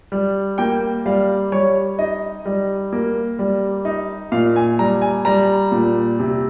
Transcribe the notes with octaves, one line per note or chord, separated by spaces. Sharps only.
G3
A#3 G5
G3 F5
G3 C#5
D#4 D#5
G3
A#3
G3
D#4
A#2 F5
G#5
G3 A#5
G#5
G3 A#5
A#2
C3